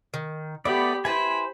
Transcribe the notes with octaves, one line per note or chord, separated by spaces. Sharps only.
D#3
A3 B3 G4 D5 B5
E4 B4 C5 G#5 B5